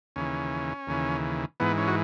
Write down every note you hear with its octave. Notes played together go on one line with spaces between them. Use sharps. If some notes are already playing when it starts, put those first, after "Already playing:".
D#2 C#3 E3 C#4
D#2 C#3 E3
G#2 E3 B3
C#4
F#4